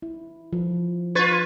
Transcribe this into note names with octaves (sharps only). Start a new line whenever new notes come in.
E4
F3
F4 B4 C#6 G#6 A6